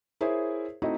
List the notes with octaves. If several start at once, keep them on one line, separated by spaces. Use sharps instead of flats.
E4 G#4 A#4 C5 C#5 E5
A3 C4 D#4 E4 F#4 D#5